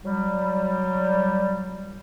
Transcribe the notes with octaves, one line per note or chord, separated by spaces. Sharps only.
F#3 G3